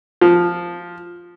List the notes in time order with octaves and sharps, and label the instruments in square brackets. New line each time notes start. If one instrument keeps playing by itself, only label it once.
[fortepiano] F3